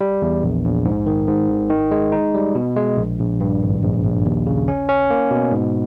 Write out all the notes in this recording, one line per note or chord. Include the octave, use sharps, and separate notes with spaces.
G3
E2
A#1
A#1
G#2
D#3
G#2
G#1
D#3
G#3
D#4
G3
B2
G#3
A#1
A#1
G2
G#1
A#1
A#1
D#2
C#3
C#4
C#4
A#3
B2
G#2